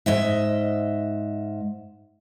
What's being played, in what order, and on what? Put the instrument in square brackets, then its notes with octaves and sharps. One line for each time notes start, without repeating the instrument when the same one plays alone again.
[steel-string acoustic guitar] G#2 D#5 E5